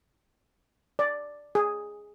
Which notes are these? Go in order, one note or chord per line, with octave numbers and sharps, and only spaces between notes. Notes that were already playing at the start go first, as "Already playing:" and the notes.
D5
G#4